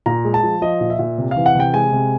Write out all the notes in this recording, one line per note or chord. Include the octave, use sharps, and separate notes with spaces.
A#2 A#5
G#3
A5
F3
F3 D#5
A#2
E5
A#2
C3
F5
E3
F#5
C3 G5
G#3 G#5
C3